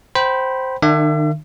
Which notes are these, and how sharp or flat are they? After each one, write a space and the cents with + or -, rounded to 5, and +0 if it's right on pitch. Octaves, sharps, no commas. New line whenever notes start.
C5 +0 G5 -25 B5 -10
D#3 -35 D4 +35 E5 +40